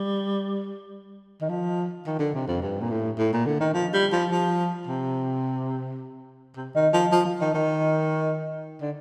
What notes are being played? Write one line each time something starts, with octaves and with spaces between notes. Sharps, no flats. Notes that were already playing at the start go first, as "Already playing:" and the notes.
Already playing: G3
D#3
F3
D#3
D3
C3
F2
G2
A#2
A2
A2
A#2
D3
D#3
F3
G3
F3
F3
C3
C3
D#3
F3
F3
F3
D#3
D#3
D3